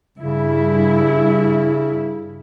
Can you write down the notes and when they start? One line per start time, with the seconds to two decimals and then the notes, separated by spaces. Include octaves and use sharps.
0.18 G2 C#3 E4